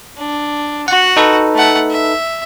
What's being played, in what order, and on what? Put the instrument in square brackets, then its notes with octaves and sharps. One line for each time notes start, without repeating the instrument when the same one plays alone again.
[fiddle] D4
[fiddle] F#4 [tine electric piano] F#5
[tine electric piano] D#4 A4 B4
[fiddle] A3 F#5
E5